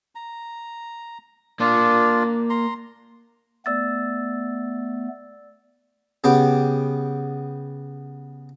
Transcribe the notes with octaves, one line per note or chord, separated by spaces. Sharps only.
A#5
A#3 D4 F4 D5
A#5 C6
A3 B3 D5 E6 A6
C#3 B3 G4